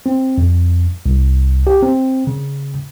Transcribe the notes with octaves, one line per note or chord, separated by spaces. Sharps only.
C4
F2
C2
G4
C4
C#3